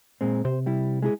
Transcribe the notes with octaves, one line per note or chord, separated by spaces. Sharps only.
A#2 G#3 C4
C3 C5
G3 E4
G#3 E4 G#4